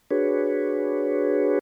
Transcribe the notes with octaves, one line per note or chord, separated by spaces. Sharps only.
D4 F#4 G#4 B4 C#5